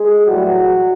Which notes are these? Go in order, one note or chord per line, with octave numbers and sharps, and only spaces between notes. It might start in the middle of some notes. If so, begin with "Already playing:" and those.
Already playing: G#3 G#4
A2 E3 F#3 G3 F#4